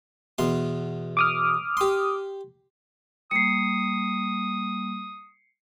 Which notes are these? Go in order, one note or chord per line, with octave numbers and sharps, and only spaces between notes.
E2 B2 C6
D6 D#6 F6
G4 C6
G3 A#3 D#6 C7 C#7